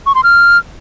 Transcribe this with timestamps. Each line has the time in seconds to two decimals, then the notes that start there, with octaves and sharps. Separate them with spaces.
0.06 C#6
0.15 C6
0.24 F6